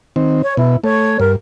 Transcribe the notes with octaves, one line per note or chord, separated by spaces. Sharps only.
D#3 C4
C#5
B2 E4
A3 C#5
G2 A#4